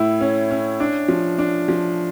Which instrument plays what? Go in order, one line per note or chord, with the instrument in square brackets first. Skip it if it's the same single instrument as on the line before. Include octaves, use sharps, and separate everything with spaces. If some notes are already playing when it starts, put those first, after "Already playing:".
Already playing: [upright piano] A2 E4
C#4
C#4
D4
F3
D4
F3